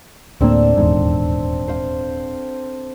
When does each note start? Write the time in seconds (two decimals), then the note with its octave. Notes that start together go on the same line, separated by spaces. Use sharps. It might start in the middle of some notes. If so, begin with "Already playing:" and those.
0.41 D1 A2 A#3 C4 D4 A4
0.77 D#1 E2 G#2
1.68 C5 F5